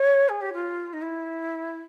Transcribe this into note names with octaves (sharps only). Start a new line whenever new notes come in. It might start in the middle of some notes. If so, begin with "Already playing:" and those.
Already playing: C#5
G#4
G4
F4
D#4
E4